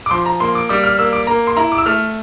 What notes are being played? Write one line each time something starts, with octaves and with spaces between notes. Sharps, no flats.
D6
F3 C6
A#5
A#3 C6
D6
G3 D6
F6
A#3 E6
D6
A#3 A#5
C6
E4 A#5
D6
E6
A3 F6